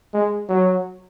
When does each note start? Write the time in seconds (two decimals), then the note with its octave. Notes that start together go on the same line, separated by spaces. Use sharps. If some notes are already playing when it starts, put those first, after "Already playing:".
0.14 G#3
0.49 F#3